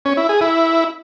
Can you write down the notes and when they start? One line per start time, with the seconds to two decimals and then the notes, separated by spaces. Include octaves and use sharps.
0.05 C#4
0.17 E4
0.29 G#4
0.41 E4